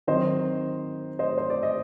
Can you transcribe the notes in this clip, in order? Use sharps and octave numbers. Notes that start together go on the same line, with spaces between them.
D#3 F#3 C4 C5 D#5
C5 D#5
C5
D5
D#5